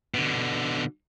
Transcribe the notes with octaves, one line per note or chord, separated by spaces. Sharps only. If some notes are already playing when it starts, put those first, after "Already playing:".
B2 D3